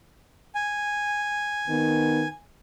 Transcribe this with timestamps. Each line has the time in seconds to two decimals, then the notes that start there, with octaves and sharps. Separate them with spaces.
0.55 G#5
1.68 D#3 B3